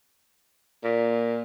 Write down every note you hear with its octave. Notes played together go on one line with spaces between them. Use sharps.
A#2